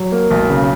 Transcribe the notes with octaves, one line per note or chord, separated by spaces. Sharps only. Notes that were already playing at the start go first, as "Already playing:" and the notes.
Already playing: F#3
A#3
B1
C#3